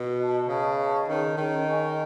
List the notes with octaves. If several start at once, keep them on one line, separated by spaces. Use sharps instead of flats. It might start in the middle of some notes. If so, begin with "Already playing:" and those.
Already playing: B2
B4 D#5 A5
C#3 B4 D#5 A5 C#6
B4 D#5 A5 C#6
D#3 C#4 G#4 C#5
D#3 C#4 G#4 C#5
G#4 D#5 G#5 C#6